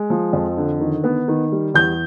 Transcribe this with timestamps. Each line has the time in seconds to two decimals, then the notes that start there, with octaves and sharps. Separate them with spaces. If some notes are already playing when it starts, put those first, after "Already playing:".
Already playing: G#3
0.10 F3
0.33 F2
0.57 D3
0.80 D#3
1.04 B3
1.28 D#3
1.52 G3
1.74 E2 G6